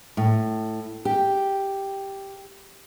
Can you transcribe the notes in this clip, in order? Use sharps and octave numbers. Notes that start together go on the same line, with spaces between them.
A2
G4